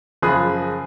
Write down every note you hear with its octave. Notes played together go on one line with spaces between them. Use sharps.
F#1 F3 G#4 B5 D#6 F#6